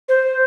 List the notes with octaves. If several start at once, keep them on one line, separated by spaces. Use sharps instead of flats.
C5